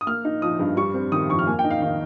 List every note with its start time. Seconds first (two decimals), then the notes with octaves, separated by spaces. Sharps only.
0.01 D#6
0.07 A#3 F6
0.25 D#4
0.42 F3 D#6
0.59 G2
0.77 G3 C#6
0.94 C4
1.12 D#3 D#6
1.29 F2 C#6
1.39 F6
1.47 A#3 G#5
1.59 G5
1.64 D#4
1.70 F5
1.82 D#3 F5